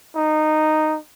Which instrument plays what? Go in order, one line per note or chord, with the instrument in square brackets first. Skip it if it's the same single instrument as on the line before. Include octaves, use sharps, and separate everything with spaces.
[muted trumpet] D#4